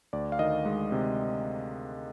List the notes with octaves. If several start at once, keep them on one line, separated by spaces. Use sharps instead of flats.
D2 D5
F5
D#3 D#5
G#3
C3